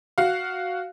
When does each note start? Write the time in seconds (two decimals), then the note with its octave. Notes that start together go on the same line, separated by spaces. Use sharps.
0.18 F#4 F5